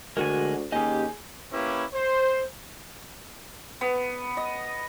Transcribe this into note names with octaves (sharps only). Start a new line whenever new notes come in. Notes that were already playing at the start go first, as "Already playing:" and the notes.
D2 D3 G#3 F#4 A#4 G#5
D#2 C#4 G4 G#4 D#5 G#5
A#3 C#4 E4 G4 B4
C5
B3
D#5